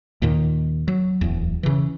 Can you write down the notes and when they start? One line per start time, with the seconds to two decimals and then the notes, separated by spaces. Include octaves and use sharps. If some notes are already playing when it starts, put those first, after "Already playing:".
0.22 D#2 A#2 D#3
0.88 F#3
1.21 D1 E2
1.63 C#3 E3